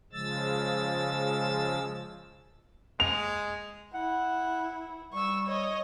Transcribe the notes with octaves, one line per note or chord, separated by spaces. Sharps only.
C#3 F3 G#3 E6 A6
G#3 F7
E4 F#5
G3 C#6 E6
C#5 D#5